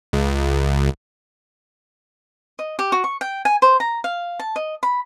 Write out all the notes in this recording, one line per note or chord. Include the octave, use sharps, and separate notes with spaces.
C#2
D#5
G4
F#4
C#6
G5
G#5
C5
A#5
F5
A5
D#5
B5